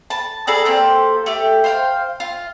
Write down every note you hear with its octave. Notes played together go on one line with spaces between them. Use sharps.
A5
G#4 A4 D5 A#5
A#3 C4 G4 A4
A3 G4
C5 F5 G5
F4